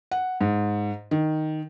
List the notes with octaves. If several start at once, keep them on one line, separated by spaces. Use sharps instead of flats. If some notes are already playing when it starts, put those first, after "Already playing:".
F#5
G#2
D#3